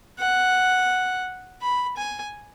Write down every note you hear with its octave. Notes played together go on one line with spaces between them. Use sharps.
F#5
B5
G#5